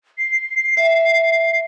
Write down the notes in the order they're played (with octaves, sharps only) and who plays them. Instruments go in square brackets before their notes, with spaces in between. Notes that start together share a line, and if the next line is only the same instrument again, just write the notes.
[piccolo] C7
[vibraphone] E5